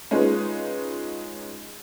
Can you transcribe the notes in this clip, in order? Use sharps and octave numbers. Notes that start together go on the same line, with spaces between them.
G#3 C#4 D#4 F4 B4